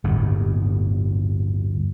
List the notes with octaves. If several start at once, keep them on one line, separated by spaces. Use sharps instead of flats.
G1 D#2 A2